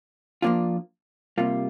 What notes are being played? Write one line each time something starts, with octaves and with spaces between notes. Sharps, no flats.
F3 A#3 D4 F4
C3 G3 A#3 F4